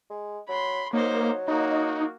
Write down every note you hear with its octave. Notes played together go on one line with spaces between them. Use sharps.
G#3
F#3 B5 C6
F#3 A#3 D#4 C5
A#3 D#4 F#4